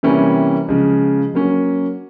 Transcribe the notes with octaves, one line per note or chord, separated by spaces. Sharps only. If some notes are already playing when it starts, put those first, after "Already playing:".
C3 E3 G3 A#3 C#4
C#3 F3 G#3
F#3 A#3 C#4